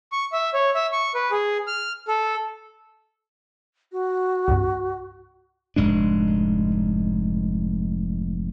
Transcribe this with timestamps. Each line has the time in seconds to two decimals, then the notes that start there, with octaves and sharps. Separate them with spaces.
0.12 C#6
0.33 E5
0.54 C#5
0.75 E5
0.92 C#6
1.15 B4
1.31 G#4
1.67 F6
2.08 A4
3.92 F#4
4.48 C2 G2
5.76 F1 G#2 G#3 D4